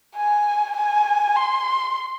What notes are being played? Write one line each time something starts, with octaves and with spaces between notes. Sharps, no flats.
G#5
G#5
C6